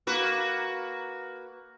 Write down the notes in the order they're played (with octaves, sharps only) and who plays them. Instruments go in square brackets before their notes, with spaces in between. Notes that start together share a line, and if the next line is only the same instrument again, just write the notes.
[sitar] A#3 F#4 B4